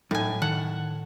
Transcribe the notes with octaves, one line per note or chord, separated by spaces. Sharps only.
A2 F#3 D#4 G#5
D#3 F#5 A5